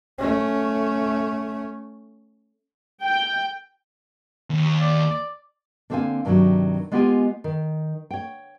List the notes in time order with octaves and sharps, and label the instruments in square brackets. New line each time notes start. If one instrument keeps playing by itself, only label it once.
[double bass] A3 C#4
[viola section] G5
[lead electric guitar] D#2
[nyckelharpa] D5
[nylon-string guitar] D3 A#3 C4 E5 F5 G#5
G2 C3 D#3 E3 F#3 G3
G#3 B3 F4 G4 D#5 G#5
D#3
C#5 G5